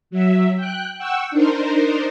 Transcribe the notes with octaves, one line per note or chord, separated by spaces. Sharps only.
F#3 E5
G5 F#6
F#5 G5 C#6 E6
D4 D#4 A#4 C5